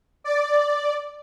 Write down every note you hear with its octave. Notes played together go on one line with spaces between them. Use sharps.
D5